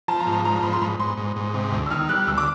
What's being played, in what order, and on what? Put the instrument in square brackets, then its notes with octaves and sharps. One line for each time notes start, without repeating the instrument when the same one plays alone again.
[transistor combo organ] F3 [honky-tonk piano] A5
[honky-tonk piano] A#5
[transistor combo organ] G#2
[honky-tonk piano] A#5
[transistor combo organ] F3 [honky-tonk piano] A#5
[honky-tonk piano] A#5
[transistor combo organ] G#2 [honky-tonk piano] B5
[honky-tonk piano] C6
[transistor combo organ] G#2 [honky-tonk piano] B5
[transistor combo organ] G#2 [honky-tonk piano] C6
[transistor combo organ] G#2
G#2
C3
D2
[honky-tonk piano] E6
[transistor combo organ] D#3 [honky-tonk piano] F6
[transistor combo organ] G3 [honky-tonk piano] F#6
[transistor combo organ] D2 [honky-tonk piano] E6
[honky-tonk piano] D6